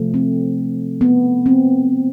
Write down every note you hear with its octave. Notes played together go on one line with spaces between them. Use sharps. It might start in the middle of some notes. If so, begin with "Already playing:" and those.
Already playing: C3 F3 A3
C4
B3
C4